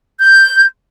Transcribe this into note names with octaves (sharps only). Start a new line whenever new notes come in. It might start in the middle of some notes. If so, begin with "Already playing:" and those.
G6